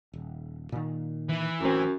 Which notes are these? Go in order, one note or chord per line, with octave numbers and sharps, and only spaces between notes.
D#1
A#2 D#3
E3
A1 F#2 C4